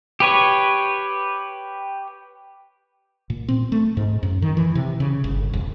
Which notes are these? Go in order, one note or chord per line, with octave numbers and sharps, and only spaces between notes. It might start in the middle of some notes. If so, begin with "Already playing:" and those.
G4 B4 C#5
A#2
C4
A3
G#2
F#2
D#3
E3
C3
C#3
G1
E1